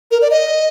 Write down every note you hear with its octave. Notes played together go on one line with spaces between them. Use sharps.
A#4
D5
D#5